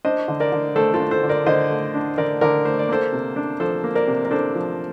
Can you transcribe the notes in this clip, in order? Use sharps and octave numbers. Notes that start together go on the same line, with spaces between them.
D4 C5 D#5
D3
A#4 D5
D3
A3 A4 C5
F4 A4
D4
A4 C5
D3
A#4 D5
D3 C5 D#5
A3
D4
D3 A#4 D5
D3 A#4 D5
A3 C5
D5
A#3 A4 C5
C3
D4
F3 A4 C5
A#3
A#4 D5
C3
A#4
D4 A4 C5
F3